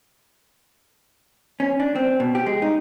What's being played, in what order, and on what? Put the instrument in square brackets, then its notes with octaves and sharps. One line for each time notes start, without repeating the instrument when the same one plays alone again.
[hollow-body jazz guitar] C#4
D4
C4
B2
G4
G#3
D#4